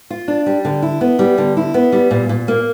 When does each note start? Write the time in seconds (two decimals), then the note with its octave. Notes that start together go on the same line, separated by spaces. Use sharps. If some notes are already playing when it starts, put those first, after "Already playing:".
0.10 F4
0.28 D4
0.46 G3
0.65 D3
0.82 E4
1.01 B3
1.19 G3
1.38 D3
1.57 E4
1.74 B3
1.92 G3
2.11 A#2
2.29 A#2
2.48 A#3